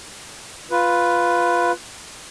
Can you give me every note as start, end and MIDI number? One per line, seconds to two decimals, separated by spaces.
0.71 1.72 65
0.71 1.72 71